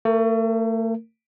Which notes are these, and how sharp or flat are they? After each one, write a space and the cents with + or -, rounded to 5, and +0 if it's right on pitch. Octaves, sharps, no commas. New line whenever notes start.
A3 +35 A#4 +0